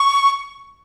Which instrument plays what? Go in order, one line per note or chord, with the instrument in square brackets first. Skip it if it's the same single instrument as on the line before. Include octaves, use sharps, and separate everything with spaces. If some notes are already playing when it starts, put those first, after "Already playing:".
Already playing: [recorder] C#6